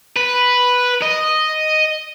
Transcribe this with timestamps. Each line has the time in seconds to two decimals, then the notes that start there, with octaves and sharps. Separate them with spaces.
0.16 B4
1.02 D#5